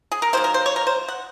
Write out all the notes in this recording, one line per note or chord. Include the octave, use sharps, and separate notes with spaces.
G#4
A#4
D#3 F#3 A#3 C5
A#4
C5
C#5
A#4
C5
F#5